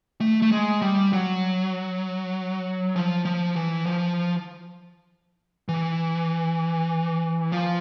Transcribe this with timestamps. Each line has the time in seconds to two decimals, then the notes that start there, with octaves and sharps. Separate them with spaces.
0.21 A3
0.42 A3
0.52 G#3
0.82 G3
1.13 F#3
2.96 F3
3.25 F3
3.56 E3
3.86 F3
5.69 E3
7.52 F3